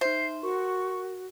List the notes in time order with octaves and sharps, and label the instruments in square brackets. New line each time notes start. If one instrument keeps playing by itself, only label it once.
[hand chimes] D#4 E5 [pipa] C5 [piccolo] C7
[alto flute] F#4 [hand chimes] A#4 [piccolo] C#6